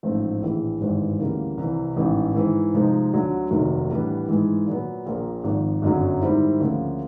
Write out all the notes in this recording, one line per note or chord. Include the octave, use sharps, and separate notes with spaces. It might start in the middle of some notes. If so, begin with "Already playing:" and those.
A1 G#2 F3 A3 C4
A#1 A2 E3
G#1 G2 E3 G#3 C4
D2 C#3 E3 G3 A#3
C2 C3 E3
A1 G#2 E3
G#2 E3 G#3 C4
C3 F3 G#3 C4 D#4
D2 D3 F#3 A3
F1 D#2 D#3 F#3 A3
A2 E3 G3 B3 D4
G#2 E3 G#3
A#2 F#3 B3
A#1 A#2 F3 A#3
G#1 G#2 F3
G1 F#2 D3 F#3
G#2 D#3 G3 C4 E4
D2 C#3 F3 A#3